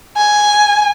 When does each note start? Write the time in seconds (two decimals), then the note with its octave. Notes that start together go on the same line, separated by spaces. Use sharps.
0.16 G#5